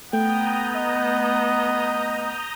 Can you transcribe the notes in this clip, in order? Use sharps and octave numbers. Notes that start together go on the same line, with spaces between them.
A3 B3 G5 A#5 D#6 G6
D#5